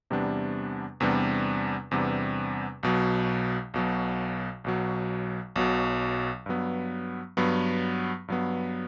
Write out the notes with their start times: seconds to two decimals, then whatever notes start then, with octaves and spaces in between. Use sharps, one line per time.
0.11 E2 C3 G3 B3 D4
1.00 E2 C3 G3 B3 D4
1.91 E2 C3 G3 B3 D4
2.83 B1 B2 F#3
3.74 B1 B2 F#3
4.64 B1 B2 F#3
5.56 B1 B2 F#3
6.46 G2 F#3 B3
7.37 G2 F#3 B3
8.28 G2 F#3 B3